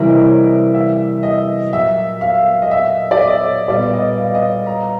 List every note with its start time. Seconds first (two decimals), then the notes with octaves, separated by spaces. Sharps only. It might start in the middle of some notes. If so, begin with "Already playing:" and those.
Already playing: C3 E3 G3 A#3 E5
0.09 D#5
0.26 C#5
0.74 E5
1.23 D#5
1.72 A#2 F#3 A#3 E5
2.21 F5
2.62 D#5
2.71 E5
3.11 D5
3.20 D#5
3.44 C#5
3.68 A#2 G3 B3 D5
3.93 D#5
4.18 F5
4.35 D#5
4.66 A#5